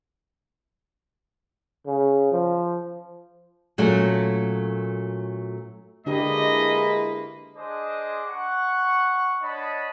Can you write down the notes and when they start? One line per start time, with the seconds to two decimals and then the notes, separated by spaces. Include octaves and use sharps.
1.86 C#3
2.32 F3
3.78 A#2 F#3 A3 C#4 F#4 A4
6.06 D3 G#3 A#3 D4 E4 G4 B4 D#5
7.56 D4 G#4 C5 D#5 C6 D6
8.26 F#5 C#6
9.41 D4 C#5 D#5 F#5 A5 B5